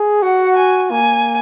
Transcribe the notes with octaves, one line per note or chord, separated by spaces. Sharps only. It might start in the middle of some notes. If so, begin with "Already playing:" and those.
Already playing: G#4
F#4 F#5
G#5
A#3 G#5